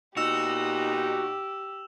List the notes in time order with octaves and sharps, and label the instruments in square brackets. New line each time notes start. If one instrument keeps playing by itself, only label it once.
[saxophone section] A#2 B3 D#4 [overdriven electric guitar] F#4 [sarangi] G4 [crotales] E6 E7 F7